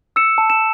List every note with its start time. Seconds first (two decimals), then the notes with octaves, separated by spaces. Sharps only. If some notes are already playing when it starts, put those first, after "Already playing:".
0.16 E6 C#7 E7
0.38 A5
0.50 E7